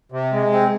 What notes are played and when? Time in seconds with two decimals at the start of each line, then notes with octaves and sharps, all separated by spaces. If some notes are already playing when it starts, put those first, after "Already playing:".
0.12 C3
0.33 G#3
0.52 C4